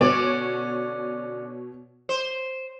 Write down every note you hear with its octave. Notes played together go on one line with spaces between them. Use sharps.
B2 D3 C#4 C#5 D5
C5